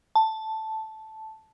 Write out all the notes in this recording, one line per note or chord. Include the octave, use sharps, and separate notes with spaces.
A5